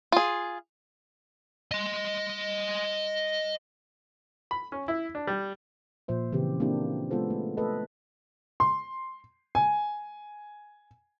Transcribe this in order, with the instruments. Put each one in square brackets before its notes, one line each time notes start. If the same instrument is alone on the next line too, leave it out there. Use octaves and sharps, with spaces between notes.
[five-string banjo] F4 G#4
[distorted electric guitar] D#5 C6
[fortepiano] B5
C#4
E4
D4
G3
[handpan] A#2 F3 C5 E5
C#3 E3 C4 G4
A#3 C4 D4 E4 G4
G#3 B3 F4 A4 C5
A3
A3 A4 B4 D#5
[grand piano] C6
G#5